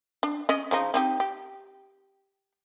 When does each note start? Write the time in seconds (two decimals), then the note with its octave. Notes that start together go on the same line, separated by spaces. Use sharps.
0.23 D4
0.49 C#4 D#5
0.71 C#3 F3 D#4
0.94 C4 D#4 G4
1.20 G4